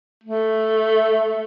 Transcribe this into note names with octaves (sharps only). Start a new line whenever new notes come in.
A3